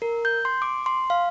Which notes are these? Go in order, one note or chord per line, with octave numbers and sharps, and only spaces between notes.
A#4
G6
C6
D6
C6
F5